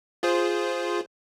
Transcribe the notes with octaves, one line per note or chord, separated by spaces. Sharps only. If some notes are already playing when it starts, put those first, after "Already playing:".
F4 G#4 C5